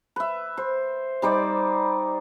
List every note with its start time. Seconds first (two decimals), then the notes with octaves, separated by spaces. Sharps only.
0.16 B4 E5
0.57 C5
1.22 G3 D#4 C5 D5